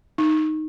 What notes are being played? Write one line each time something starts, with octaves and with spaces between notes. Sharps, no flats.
D#4